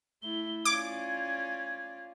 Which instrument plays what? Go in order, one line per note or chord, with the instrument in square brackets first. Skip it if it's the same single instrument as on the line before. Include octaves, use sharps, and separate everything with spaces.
[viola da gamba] A3 E4 [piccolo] G7
[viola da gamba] C#4 F4 D5 [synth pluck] D6 [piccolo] G#6